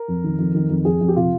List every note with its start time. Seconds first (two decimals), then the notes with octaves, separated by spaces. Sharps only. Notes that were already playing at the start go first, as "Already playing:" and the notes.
Already playing: A#4
0.08 F2
0.24 D#3
0.39 F2
0.55 D#3
0.70 F2
0.85 F2 G#4
1.01 F2
1.08 G4
1.16 C3 F4